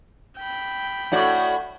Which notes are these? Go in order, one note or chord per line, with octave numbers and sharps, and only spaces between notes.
G5 B5
A2 F#4 D5